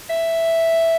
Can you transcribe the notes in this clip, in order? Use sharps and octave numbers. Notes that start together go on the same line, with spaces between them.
E5